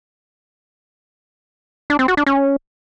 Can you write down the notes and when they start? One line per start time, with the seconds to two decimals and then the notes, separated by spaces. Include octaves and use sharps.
1.90 D4
1.99 C4
2.08 F#4
2.17 D4
2.26 C#4